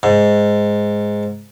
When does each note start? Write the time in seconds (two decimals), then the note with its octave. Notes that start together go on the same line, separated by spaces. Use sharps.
0.03 G#2